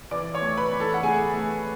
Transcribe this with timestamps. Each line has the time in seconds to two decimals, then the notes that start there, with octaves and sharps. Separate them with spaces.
0.11 E3 D5 D6
0.34 C#5 C#6
0.42 A3
0.57 B4 B5
0.73 E3
0.80 A4 A5
0.94 F#5
1.03 A3 G#4 G#5
1.34 A3